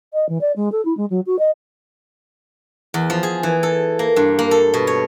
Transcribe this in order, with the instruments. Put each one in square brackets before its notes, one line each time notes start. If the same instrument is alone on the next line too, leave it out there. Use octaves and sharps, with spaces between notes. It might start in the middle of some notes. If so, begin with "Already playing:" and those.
[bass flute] D#5
E3
D5
G#3
A4
E4
G#3
F#3
F#4
D#5
[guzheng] E2
F3
G#4
E3
A4
A#3
G2
A#3
A4
B2
C#5